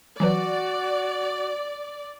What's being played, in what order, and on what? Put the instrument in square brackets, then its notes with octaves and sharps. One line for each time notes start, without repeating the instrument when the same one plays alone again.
[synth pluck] E3 F#3 B4 [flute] F#4 [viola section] D5